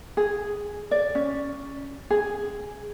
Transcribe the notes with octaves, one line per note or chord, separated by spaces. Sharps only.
G#4
D5
C#4
G#4